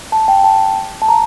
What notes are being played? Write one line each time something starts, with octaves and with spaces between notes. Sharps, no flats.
A5
G5
A5
A5
A#5